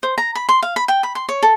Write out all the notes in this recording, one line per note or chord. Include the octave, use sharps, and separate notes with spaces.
C5
A#5
B5
C6
F5
B5
G5
B5
C6
C#5
A4